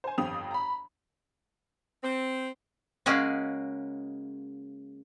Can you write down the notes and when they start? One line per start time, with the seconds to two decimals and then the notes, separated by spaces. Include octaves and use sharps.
0.04 C5 G#5
0.18 G1 F2 C4 G4 D#6 F7
0.51 A#5 B5
2.04 C4
3.06 C#3 G#3 A#3 C#4 F#4